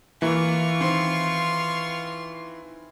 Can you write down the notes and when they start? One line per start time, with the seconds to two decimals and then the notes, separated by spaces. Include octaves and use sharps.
0.22 E3 A#3 E4 F4 C#6
0.80 D#3 C4 C6